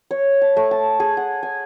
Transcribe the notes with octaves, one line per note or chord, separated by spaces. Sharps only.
C#5
A5
A3
A5
G#4
F#5
G#5